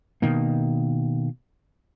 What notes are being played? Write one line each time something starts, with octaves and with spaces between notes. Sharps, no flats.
B2 D#3 A#3